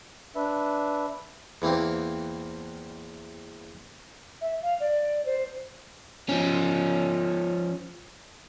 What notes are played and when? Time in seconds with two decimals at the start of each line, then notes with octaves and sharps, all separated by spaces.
0.35 D4 B4 E5
1.62 E2 E3 A#3 C4
4.41 E5
4.62 F5
4.80 D5
5.26 C5
6.29 F3 C#4